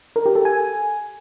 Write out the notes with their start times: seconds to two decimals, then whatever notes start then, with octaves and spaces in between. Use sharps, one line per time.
0.16 A#4
0.26 G4
0.35 A4
0.45 G#5